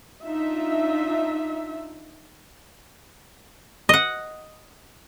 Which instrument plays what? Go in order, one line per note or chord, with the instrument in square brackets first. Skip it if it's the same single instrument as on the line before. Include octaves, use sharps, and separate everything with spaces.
[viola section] D4 D#4 F4 E5
[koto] D#5 F#5